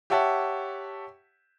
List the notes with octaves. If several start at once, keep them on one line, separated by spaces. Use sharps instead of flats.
G4 C#5 E5 F#5 A5